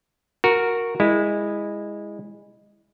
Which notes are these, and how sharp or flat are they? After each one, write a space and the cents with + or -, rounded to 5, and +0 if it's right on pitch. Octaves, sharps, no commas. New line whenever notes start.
F#4 -10 A#4 +0
G#3 -15 E4 -5